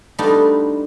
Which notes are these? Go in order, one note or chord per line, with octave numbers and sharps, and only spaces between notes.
G3 A3 B3 D4 D#4 F4